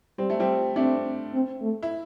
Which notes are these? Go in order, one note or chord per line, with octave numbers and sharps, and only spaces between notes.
G3 C4
A3
G3 C4
A3 C4 D4
C4
A3
E4